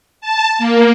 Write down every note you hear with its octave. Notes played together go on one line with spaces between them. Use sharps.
A5
A#3